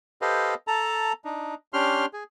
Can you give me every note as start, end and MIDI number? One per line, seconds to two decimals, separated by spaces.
0.22 0.54 67
0.22 0.54 69
0.22 0.54 71
0.22 0.54 72
0.22 0.54 75
0.22 0.54 77
0.67 1.12 69
0.67 1.12 81
0.67 1.12 82
1.25 1.55 62
1.25 1.55 63
1.73 2.06 61
1.73 2.06 62
1.73 2.06 67
1.73 2.06 84
1.73 2.06 89
2.13 2.24 68